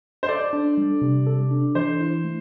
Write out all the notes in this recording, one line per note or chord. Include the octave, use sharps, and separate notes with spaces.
C5
A4 D5
D4
G3
C3
A4
D4
E3 C5
E4
A3